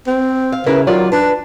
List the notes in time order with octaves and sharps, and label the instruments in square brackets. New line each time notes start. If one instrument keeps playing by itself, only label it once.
[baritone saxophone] C4
[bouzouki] F5
[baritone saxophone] C#3 [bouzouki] E4 A#4 B4
[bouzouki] D#3 F4 D5 [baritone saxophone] F#3
[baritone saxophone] D4 [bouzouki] B4